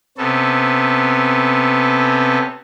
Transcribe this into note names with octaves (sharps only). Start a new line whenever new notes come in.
C3 B3 C#4 A4